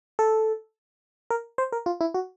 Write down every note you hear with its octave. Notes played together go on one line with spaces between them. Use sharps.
A4
A#4
C5
A#4
F4
E4
F#4